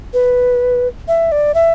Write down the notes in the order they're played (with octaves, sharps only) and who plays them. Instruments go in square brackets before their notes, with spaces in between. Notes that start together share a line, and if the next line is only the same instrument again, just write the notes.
[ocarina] B4
E5
D5
E5